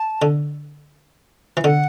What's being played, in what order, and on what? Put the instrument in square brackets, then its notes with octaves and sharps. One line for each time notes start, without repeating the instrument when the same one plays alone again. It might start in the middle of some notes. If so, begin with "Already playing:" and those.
Already playing: [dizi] A5
[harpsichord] D3
E3
[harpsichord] D3 [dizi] F#5